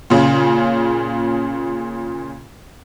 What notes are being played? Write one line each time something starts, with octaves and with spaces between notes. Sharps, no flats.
A#2 C#3